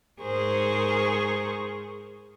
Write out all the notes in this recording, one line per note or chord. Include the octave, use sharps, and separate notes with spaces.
G#2 G#4 A#4 C5 C#6